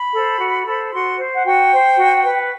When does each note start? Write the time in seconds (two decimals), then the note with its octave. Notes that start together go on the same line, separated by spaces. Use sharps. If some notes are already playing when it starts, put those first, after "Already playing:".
Already playing: B5
0.14 A4 C5
0.40 F#4
0.67 A4 C5
0.92 F#4 C6
1.18 C5
1.35 F#5
1.45 F#4 G5
1.71 C5
1.97 F#4
2.24 B4